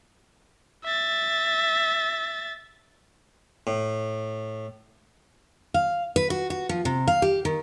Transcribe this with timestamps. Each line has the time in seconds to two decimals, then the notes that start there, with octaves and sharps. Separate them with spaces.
0.84 E5 A6
3.67 A2
5.74 F5
6.16 B4
6.30 F#4
6.50 F#4
6.69 F3
6.85 C3
7.08 F5
7.22 G4
7.45 D#3